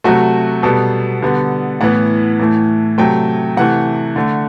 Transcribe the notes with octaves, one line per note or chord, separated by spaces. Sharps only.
C3 F#3 A3 F#4
B2 G3 B3 A4
D3 G3 B3
A2 E3 B3 F#5
A2 E3 A3
C3 F#3 A3 G5
C3 E3 A3 F#5
D3 A3